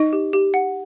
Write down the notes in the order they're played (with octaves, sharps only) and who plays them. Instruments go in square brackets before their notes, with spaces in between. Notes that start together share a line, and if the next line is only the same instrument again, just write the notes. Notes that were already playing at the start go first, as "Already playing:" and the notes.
Already playing: [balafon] D#4 [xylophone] D#5
[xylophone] G4
G4
F#5